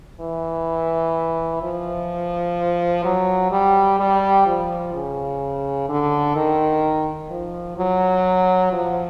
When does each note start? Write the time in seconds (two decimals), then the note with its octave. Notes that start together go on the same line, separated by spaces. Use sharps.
0.20 E3
1.62 F3
3.05 F#3
3.51 G3
3.99 G3
4.47 F3
4.94 C#3
5.89 D3
6.36 D#3
7.30 F3
7.78 F#3
8.73 F3